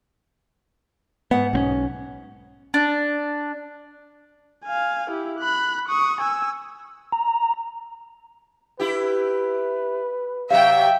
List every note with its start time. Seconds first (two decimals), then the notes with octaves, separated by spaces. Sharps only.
1.31 G#2 B3 F#5
1.53 B1 C4 C#4
2.74 D4
4.64 F5 G#5
5.10 E4 G4
5.39 B5 F#6
5.88 C#6 D#6
6.21 G#5 E6
7.12 A#5
8.80 E4 G4 B4
10.50 C3 F#3 E5 F5 G5